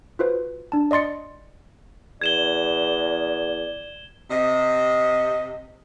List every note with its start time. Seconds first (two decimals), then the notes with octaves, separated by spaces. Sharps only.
0.19 F4 F#4 B4 C5
0.72 D4 A5
0.91 D5 D#5 C6 A6 C#7
2.21 E2 D5 G#6 E7 G7
4.31 C3 D#5